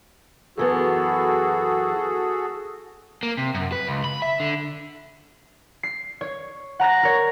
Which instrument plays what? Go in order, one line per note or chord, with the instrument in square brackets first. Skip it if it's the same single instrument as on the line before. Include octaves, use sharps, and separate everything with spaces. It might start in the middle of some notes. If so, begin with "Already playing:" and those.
[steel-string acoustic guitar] F#2 E3 B3 [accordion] F#4 G#4 A4
[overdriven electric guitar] A#3
C3
F#2
B4
C#2
B5
E5
D3
[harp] C7
C#5
F#5 A#5 F#6 A#6
A#4 C#5